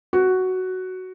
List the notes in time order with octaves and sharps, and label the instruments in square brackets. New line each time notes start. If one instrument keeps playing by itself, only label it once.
[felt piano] F#4